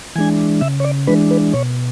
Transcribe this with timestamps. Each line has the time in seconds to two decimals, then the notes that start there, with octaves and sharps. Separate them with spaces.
0.16 E3 G#3 D4 G#5
0.61 C#3 E5
0.80 C#5
0.84 D5
1.07 E3 G#3 D4 B4
1.31 B4
1.53 B2 C#5